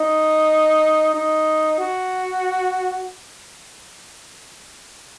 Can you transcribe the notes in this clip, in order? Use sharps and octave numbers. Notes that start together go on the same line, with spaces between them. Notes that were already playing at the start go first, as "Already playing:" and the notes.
Already playing: D#4
D#4
F#4